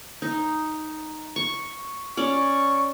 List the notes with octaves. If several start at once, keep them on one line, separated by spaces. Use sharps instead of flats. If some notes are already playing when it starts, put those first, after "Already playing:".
D#4
C#6
C#4 D5 C#6